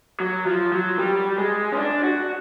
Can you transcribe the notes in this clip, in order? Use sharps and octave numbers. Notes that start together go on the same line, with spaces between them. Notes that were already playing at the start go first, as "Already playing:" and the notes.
F#3
F3
F#3
G3
G#3
C#4
D4
F#4